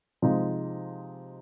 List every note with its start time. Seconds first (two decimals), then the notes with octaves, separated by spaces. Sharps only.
0.22 C3 F3 G#3 D#4